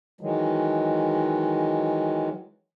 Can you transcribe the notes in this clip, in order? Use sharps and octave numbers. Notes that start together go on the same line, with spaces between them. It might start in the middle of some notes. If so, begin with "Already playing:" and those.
D#3 E3 F#3 G#3